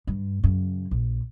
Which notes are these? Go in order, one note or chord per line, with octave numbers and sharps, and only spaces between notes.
G2
F#2 C#3
A#1